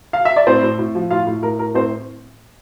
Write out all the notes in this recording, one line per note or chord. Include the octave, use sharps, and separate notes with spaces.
F5
E5
D5
A2 C4 C5
A2
A2
F3
A2 F4 F5
A2
A2 A#4
A2 A#4
A2 C4 C5